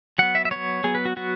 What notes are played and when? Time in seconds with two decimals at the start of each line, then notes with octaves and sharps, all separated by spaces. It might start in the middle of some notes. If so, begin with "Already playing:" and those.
0.18 F#3 B3 F#5
0.35 E5
0.45 E5
0.51 F#3 B3 C#5
0.84 F#3 B3 G#4
0.95 B4
1.05 F#4
1.16 F#3 B3 F#4